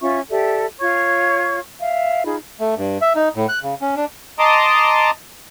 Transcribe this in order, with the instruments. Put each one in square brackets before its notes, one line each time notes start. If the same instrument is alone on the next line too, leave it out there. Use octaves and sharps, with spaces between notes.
[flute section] C#4 F4 E5 C#6
G4 A4 D5 E5
F4 C#5 C#6 G#6
E5 F5
D#4 F4 G#4 B5
[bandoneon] A3
G2
E5
D#4
A2
F#6
C#3
C#4
D4
[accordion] D#5 A5 A#5 C6 D6 D#6